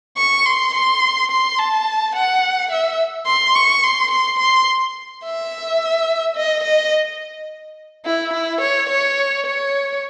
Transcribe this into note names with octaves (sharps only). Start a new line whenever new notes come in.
C#6
C6
C6
C6
A5
F#5
E5
C6
C#6
C6
C6
C6
E5
D#5
D#5
E4
E4
C#5
C#5
C#5